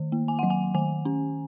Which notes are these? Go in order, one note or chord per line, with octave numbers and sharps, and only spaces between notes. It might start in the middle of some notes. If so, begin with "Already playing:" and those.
Already playing: D#3
A#3
G#5
F#3 F#5
G#5
D#3 G#5
C#4